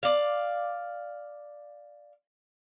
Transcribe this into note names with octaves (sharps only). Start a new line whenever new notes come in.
D5 F5